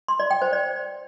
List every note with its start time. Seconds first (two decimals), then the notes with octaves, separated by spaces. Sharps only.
0.08 C6
0.20 D5
0.31 G5
0.42 C5
0.53 D5